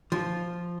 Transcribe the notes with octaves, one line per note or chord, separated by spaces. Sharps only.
F3